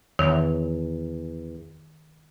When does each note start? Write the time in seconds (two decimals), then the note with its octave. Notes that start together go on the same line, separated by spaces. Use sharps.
0.19 E2 D#3